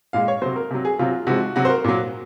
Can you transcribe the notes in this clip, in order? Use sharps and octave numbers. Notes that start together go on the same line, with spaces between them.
A#2 G#3 F5
C#5
C3 F#3 C5
A#4
C3 F#3
G#4
C3 F#3 F4
C3 F3 G#3 F#4
C3 F#3 F#4
C5
A#4
A#2 F#3